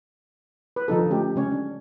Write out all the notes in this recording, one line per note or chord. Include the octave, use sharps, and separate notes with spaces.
B4
D3 F3 D#4 A4
A3 C#4 G4
C#3 G#3 C#4 C#5
D4